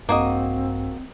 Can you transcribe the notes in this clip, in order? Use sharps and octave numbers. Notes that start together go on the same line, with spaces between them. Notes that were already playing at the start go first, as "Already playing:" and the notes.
A#1 G2 A#3 C4 F#4 D#5